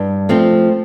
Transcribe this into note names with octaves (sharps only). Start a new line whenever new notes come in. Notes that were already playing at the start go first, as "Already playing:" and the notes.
Already playing: G2
F3 A3 C4